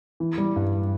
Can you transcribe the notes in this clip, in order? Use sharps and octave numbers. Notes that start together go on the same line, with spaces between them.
E3
G3
G2